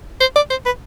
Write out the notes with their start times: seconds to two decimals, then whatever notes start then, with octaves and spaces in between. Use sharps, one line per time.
0.20 C5
0.36 D5
0.50 C5
0.66 B4